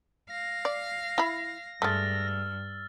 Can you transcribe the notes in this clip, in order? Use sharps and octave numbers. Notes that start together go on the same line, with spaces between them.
F5 A#6
D5
E4 B5
G2 G#3 A3 E6 F6 A6